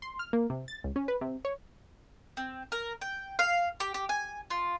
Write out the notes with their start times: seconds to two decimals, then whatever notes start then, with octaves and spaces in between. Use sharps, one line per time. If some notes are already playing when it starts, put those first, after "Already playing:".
0.02 C6
0.19 F6
0.33 A#3
0.50 C3
0.68 A6
0.84 C#2
0.96 C#4
1.08 B4
1.21 C3
1.45 C#5
2.37 C4
2.72 A#4
3.01 G5
3.39 F5
3.80 G4
3.94 G4
4.09 G#5
4.50 F4